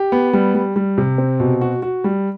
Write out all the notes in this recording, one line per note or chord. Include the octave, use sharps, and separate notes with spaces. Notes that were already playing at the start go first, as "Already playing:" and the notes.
Already playing: G4
B3
G3
G3
G3
C3
C4
B2
F#4
F#4
G3